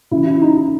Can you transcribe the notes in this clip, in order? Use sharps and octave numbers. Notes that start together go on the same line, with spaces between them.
C#3 E3 E4
E4
D#4
D#4